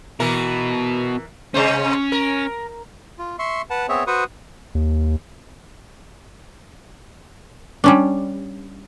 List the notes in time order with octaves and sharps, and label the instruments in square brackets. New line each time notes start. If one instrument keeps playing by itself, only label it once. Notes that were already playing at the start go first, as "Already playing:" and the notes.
[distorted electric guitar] B2 [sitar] E3 A#4
[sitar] C3 G#3 C5 [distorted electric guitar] C#4
[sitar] A#4
[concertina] F4
E5 C6 C#6
B4 F#5 A5
B3 C4 G#4 C#5 E5
F#4 B4 C5 C#6 D#6
[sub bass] D#2
[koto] G3 C#4 D4